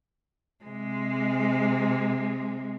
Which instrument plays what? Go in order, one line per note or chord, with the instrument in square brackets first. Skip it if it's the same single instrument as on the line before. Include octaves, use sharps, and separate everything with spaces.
[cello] C3 G#3